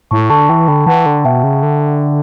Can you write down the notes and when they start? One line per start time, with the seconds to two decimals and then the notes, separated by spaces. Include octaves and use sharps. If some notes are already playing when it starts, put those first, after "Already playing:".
0.11 A2 A5 C#6
0.30 D3 A5 C#6
0.49 E3 G5 B5
0.68 D3 G5 B5
0.86 E3 F#5 A5
1.06 D3
1.25 B2 E5 G5
1.44 C#3
1.63 D3